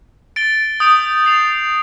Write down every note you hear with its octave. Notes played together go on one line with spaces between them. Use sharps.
A6 D7 G7
D#6 G6 D7 F7
A6 C7 F7